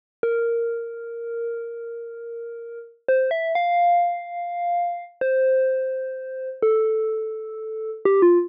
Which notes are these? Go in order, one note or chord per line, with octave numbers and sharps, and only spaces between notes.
A#4
C5
E5
F5
C5
A4
G4
F4